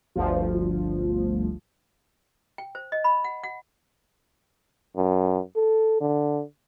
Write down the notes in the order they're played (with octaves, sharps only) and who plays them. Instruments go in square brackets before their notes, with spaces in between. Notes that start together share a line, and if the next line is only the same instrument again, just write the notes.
[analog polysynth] G1 D2 F3
[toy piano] G5
C5
D#5
B5
F#5
F#5
[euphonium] F#2
A4
D3